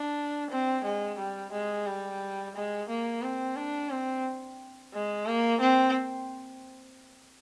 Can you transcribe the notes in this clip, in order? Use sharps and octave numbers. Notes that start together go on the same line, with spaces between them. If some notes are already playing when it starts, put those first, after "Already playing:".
Already playing: D4
C4
G#3
G3
G#3
G3
G#3
A#3
C4
D4
C4
G#3
A#3
C4